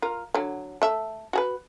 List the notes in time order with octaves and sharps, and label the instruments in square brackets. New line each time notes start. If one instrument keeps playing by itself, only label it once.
[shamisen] F4 A#4
D3 F#3
A3 E5
F#4 G#4 B4